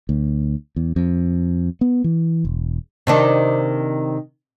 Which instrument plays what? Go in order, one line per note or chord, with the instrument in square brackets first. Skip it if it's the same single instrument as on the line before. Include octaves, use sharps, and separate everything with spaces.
[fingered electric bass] D2
E2
F2
B3
E3
E1
[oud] C3 D#3 D4